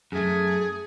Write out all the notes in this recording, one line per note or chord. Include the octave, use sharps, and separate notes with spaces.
F#2 A3 G#4